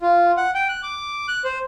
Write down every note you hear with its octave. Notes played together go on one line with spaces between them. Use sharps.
F4
F#5
G5
F#6
D6
F#6
C5